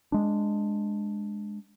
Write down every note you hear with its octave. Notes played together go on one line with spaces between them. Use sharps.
G#3 D4